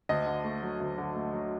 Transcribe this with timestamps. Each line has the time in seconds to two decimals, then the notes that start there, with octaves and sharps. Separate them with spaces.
0.09 D2 D#5
0.26 D3
0.44 A3
0.62 F#3
0.80 D2
0.98 D3
1.16 A3
1.33 F#3